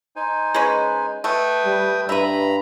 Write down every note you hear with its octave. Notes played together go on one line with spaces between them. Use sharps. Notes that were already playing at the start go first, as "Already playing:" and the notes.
D#4 C5 G#5
G#3 C#4 B4
A3 B4 G5 D#6
G3
G2 B4 E5 A#5 B5